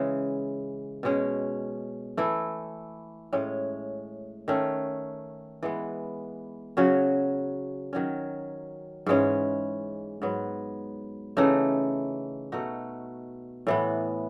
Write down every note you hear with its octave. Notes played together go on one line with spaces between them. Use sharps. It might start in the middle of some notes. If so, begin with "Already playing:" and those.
Already playing: C#3 E3 G#3
B2 G#3 C#4
E3 A3 E4
A2 G#3 C#4
D#3 A3 C#4
E3 G#3 B3
C#3 F#3 C#4 F#4
D#3 F#3 C#4
G#2 E3 G#3 C#4
G#2 F#3 B3
C#3 E3 A3 D#4
B2 A3 D#4 F#4
A2 E3 B3